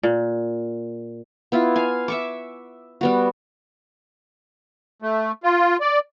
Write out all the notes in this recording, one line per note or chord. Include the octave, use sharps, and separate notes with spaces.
A#2
B3 E4 F4
F5 G#5
E5 C#6 D6
G3 B3 F#4
A3
F4
D5